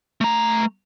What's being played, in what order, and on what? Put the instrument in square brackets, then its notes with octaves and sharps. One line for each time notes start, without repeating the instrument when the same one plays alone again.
[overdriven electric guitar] A3 A#5